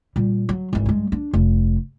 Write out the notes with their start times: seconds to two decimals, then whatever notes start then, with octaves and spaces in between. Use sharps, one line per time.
0.16 A#2 G3
0.49 F#3
0.73 G#1 E3
0.86 G2 G#3
1.12 D4
1.33 F1